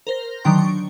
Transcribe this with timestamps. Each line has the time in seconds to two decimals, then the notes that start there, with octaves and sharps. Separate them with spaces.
0.07 A#4 C5 A#6
0.44 D3 D#3 F#3 D4 G5 C6
0.58 C#6